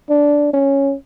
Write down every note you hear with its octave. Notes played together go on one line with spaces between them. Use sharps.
D4
C#4